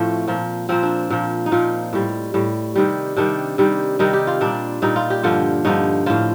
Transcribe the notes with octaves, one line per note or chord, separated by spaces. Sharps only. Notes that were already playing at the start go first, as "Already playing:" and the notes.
Already playing: A2 F3 A3 C4
A#2 F3
A#2 F3 C4
D4
A#2 F3
D#4
A#2 F3 F4
A2 G3
A2 G3
C3 D#3 G3
C3 D#3 G3 D4
C3 D#3 G3
C3 D#3 G3 D#4
G4
F4
A#2 G3 D4
A#2 G3 D#4
F4
G4
G2 D3 F3 F4
G2 D3 F3 D#4
A2 F3 F4